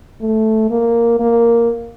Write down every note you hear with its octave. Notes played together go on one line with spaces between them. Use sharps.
A3
A#3
A#3